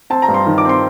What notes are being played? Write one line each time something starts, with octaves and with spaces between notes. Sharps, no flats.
C4 A5
A#5
G2
C6
D#3
D6
C4 C6